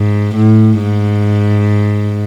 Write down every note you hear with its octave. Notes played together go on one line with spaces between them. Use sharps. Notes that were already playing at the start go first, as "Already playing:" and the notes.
Already playing: G#2
A2
G#2